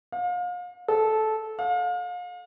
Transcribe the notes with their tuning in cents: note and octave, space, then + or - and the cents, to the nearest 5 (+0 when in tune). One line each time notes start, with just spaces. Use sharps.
F5 +35
A4 -15
F5 +35